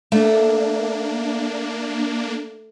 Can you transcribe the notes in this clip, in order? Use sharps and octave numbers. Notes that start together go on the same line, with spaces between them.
A3 A#3 D4